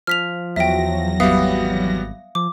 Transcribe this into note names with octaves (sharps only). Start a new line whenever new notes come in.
F3 F6 B6 F7
E2 F#3 E5 G5 A#6
G#1 G3 B3 E5 F5 D#6
F3 D6